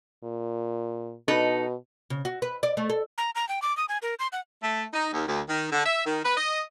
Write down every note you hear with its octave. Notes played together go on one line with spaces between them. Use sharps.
A#2
B2 D#4 A4 B4
C#3
F#4
B4
D5
A3
A4
A#5
A#5
G5
D6
D#6
G#5
A#4
C6
F#5
A3
D#4
D#2
D2
D#3
D3
E5
D#3
B4
D#5